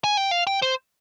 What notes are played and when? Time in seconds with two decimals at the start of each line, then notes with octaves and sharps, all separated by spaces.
0.04 G#5
0.17 G5
0.31 F5
0.47 G5
0.62 C5